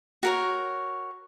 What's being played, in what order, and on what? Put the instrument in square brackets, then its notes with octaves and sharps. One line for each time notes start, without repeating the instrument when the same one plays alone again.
[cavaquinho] F#4 A#4 C#5